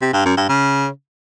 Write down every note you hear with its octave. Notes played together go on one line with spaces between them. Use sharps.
C3
G2
F#2
G2
C#3